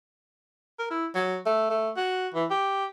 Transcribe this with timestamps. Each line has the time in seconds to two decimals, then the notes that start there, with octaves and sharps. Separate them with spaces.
0.79 A#4
0.90 E4
1.15 F#3
1.46 A3
1.70 A3
1.97 F#4
2.34 E3
2.51 G4